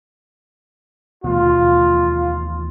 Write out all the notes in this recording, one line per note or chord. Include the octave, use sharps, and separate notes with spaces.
D#2 B2 E3 A3 F4